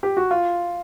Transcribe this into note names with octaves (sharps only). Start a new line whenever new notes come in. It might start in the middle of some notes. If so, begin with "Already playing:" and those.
G4
F#4
F4